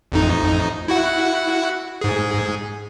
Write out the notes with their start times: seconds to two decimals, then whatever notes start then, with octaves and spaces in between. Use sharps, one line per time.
0.12 A1 F2 D#4
0.88 E4 F#4 F#5
2.01 G#2 G#4